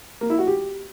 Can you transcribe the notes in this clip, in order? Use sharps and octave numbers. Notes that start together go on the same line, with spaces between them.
A#3
E4
F#4
G4